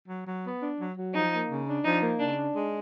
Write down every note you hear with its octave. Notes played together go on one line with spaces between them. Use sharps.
F#3
F#3
B3
D4
F#3
F#3
F3 D#4
A#3
C#3
D4
F3 D#4
A#3
C#3 D4
D4
G#3